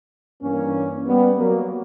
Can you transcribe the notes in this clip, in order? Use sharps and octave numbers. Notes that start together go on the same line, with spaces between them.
G2 E3 A#3 C#4
G3 B3
F#3 A#3